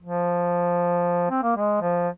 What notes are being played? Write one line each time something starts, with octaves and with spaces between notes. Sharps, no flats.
F3
C4
A#3
G#3
F3